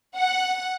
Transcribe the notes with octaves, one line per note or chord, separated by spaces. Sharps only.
F#5